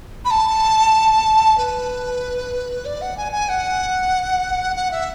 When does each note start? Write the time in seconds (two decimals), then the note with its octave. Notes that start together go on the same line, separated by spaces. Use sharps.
0.25 B5
0.30 A5
1.58 B4
2.85 D5
3.01 F#5
3.17 G#5
3.32 G#5
3.49 F#5
4.76 F#5
4.91 E5